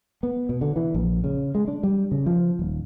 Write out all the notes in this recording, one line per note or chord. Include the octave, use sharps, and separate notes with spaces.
B3
B2
D3
E3
A#1
C#3
G#3
D4
G3
C#3
F3
D#1